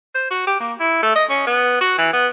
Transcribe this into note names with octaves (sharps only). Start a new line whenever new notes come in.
C5
F#4
G4
A#3
E4
A3
D#5
C#4
B3
F#4
E3
B3